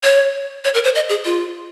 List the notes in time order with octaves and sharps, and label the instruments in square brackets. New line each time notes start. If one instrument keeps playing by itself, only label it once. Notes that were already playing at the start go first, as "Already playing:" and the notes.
[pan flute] C#5
C#5
A#4
C5
D#5
G#4
F4